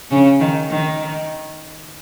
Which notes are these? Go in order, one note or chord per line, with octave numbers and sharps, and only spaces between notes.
C#3 C#4
D#3
D#3